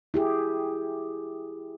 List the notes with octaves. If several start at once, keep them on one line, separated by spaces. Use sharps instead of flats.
E4 G4 G#4